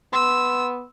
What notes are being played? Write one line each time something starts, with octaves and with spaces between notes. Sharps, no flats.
B3 C6 E6